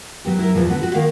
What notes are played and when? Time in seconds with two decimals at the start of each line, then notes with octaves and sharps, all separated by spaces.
0.25 F#3 B3 G4
0.39 E4 A#4
0.55 E2 B2 F3
0.69 D3 B3 F#4
0.83 F#4
0.94 D#3 A#3 F5